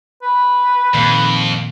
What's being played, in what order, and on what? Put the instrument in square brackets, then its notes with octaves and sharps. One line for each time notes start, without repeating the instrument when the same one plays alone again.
[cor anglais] B4
[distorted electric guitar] F2 [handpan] A#2 D#3 A#3